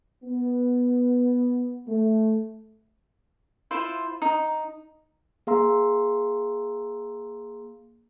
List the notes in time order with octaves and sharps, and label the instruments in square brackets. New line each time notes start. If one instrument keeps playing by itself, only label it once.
[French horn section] B3
A3
[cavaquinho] E4 F4 C5
D#4
[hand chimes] A#3 G#4 F5 A#5 C6 E6